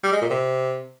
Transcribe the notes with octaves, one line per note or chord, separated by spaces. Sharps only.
G3
G#3
A#2
C3